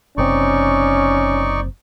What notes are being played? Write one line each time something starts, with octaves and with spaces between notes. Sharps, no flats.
F#1 C3 C4 C#4 D#4 D5 C#6